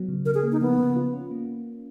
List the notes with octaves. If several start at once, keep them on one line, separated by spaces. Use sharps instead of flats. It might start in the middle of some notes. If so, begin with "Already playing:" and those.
Already playing: F#3 B3
C#3
C#3 A#4
G#4
A#3
D#4
F3 B3
C#3
F4
C#4
A#3